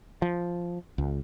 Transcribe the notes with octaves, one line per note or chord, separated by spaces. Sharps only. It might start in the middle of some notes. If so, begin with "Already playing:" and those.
F3
C#2